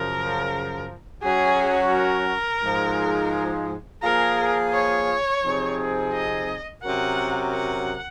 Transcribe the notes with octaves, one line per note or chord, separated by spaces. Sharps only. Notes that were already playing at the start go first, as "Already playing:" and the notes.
Already playing: F#2 C#3 F3 A#4
F#3 C#4 F#4 G#4
A#4
G#2 F3 G#3
F3 A#3 F4 G#4 A#4
C#5
C3 F3 C4 D#4 G#4
D#5
C3 F#3 C#4 F#4 A#4 F#5
F#5